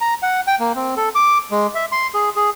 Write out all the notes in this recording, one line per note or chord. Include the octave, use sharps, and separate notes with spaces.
A#5
F#5
G5
A#3
C4
A4
D6
G#3
E5
C6
G#4
G#4